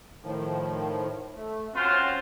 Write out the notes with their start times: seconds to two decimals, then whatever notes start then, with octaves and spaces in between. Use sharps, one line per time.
0.23 A2 D#3 F3
1.36 A3
1.75 C4 C#4 F4 F#4 C5